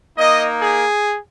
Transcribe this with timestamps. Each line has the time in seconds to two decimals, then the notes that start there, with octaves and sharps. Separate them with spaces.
0.18 A#3 D#4 D#5
0.60 G#4